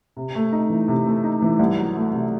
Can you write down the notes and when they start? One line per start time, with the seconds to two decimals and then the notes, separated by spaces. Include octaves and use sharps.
0.17 C3
0.35 A3
0.52 D#4
0.70 E3
0.88 C3
1.07 A3
1.24 D#4
1.42 E3
1.59 C2
1.78 F#3
1.96 A3
2.12 C3